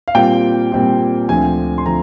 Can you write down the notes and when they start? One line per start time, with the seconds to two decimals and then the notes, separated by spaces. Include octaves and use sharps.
0.08 F5
0.15 A#2 G3 C4 F4 G5
0.72 A#2 G3 C4 F4
1.29 D2 D3 F3 C4 G#5
1.78 C6
1.86 D3 F3 C4 A#5